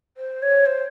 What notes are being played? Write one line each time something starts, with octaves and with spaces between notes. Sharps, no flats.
C5
C#5
C5